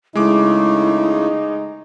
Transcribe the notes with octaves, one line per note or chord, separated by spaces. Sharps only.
C#3 G#3 A3 D#4 E4 D6